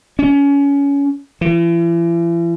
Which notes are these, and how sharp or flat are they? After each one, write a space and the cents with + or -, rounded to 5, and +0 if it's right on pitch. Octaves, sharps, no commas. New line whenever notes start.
C#4 +25
E3 +40